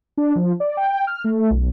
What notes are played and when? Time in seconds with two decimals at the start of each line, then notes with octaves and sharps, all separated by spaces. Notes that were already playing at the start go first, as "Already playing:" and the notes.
0.17 D4
0.35 F3
0.60 D5
0.77 G5
1.07 F6
1.24 A3
1.50 B1